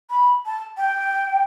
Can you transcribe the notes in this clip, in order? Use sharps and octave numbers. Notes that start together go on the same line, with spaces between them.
B5
A5
G5